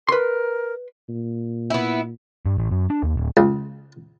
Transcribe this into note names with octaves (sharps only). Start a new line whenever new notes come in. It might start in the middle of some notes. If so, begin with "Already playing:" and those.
A#4 B4 C6
A#2
B3 E4
G2
A1
F#2
D4
D#2
D1
C#2